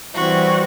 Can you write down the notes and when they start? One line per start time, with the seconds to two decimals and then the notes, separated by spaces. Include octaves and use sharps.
0.15 E3 G3 C4 F#4